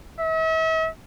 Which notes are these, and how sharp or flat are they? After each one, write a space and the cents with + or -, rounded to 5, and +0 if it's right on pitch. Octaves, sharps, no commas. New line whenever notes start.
E5 -40